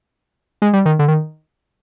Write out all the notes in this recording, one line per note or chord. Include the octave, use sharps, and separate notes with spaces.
G#3
G3
D#3
D3
D#3